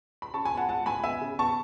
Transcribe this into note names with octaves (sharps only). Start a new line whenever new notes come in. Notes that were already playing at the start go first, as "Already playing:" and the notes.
B5
C#3 A5 C#6
G#5 B5
B3
F#5 A5
C#2 F#5 A5
C#2 G#5 B5
B3 E5 G#5
C#3
B3 A5 C#6